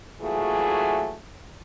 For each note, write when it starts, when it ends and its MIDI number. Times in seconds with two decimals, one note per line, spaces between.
0.21 1.15 46
0.21 1.15 52
0.21 1.15 54
0.21 1.15 57
0.21 1.15 68